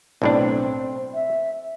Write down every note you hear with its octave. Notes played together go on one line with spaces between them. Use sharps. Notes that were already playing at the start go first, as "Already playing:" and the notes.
B1 A2 C4 D4
E5